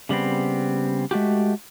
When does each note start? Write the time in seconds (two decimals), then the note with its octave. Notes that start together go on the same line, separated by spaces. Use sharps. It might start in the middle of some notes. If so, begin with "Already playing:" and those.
0.09 C#3 G3 B3 C4
1.11 G#3 A3 F#4 G4